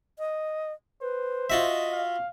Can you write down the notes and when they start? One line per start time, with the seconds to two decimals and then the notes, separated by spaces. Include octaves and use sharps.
0.19 D#5
1.02 B4 C5
1.50 F4 F#4 D#5 E5
1.92 F5